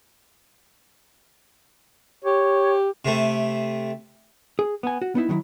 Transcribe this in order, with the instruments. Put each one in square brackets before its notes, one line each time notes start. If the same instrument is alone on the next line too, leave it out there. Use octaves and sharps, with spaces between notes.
[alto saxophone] G4 [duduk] C#5
[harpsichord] C3 A3
[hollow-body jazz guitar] G#4
B3 G#5
F#4
B3 D#4 E4
D#3 F#3 D#4 E4